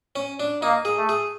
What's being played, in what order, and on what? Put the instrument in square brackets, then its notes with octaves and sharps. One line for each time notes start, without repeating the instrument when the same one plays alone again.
[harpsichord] C#4
D4
[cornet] A#3 [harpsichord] D#4
[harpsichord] G#4
[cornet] A3
[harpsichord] G#4